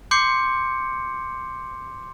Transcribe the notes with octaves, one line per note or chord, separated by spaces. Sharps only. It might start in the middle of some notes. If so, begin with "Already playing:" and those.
C6 D6 G6 C7 C#7